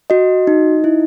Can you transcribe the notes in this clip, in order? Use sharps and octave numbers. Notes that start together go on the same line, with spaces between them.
F#4 D#5
D#4
E4